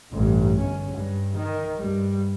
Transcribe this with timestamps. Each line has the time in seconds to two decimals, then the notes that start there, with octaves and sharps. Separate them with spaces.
0.12 A1 G2
0.59 G1 C#4
0.90 G2
1.37 D#3
1.77 G2 G3